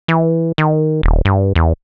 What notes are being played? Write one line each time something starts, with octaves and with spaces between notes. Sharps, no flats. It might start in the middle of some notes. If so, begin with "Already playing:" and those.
E3
D#3
D#1
G2
E2